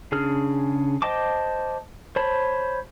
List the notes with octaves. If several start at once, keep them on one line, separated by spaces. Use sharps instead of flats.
C#3 D4 G#4 F6
C5 D#5 G5 A5 D6
C5 C#5 A5 B5